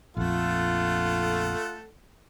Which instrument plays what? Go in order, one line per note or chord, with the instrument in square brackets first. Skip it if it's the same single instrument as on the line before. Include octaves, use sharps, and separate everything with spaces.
[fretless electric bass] A#1 F2 [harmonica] A3 A4 F#5 [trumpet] F4